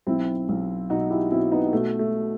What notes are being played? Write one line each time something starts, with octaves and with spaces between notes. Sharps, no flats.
B1 C4 E4
B1
B2 D#4 F#4
E4 G4
B2 C4 E4
B3 D#4
B2 A3
A3